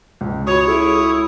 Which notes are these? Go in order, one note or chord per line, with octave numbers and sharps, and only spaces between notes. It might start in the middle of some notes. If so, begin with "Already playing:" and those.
C#2
F#4 C#5 B5 C#6 D#6
E4 G#4 A4